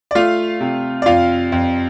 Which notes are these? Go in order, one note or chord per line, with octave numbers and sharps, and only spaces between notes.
D5
A3 F4 F5
C3
D5
F2 F4 F5
F2